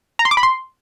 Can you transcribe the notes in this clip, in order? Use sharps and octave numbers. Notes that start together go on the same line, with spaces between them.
A#5
C6
D6
B5
C6